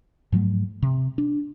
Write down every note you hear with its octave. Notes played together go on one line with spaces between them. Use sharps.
G#2 F3 F#3 A3
C3
D4